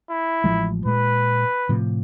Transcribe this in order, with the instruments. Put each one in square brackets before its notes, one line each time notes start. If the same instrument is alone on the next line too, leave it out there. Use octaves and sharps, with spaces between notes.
[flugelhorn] E4
[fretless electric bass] A1 F3 G#3
[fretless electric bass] A#2 G#3 [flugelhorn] B4
[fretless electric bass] A2 C3 F3